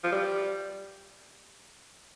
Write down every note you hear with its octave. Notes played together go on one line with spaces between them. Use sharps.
F3
G3